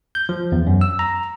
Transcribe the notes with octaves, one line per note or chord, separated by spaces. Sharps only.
G6
F3
E2
F#2
E6
A#5